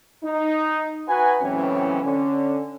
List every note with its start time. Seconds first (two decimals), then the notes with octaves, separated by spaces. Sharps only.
0.24 D#4
1.07 D#4 F#4 B4 F#5 G#5
1.41 C#2 A2 E3 F#3 C4 C#4
2.04 D3 C#4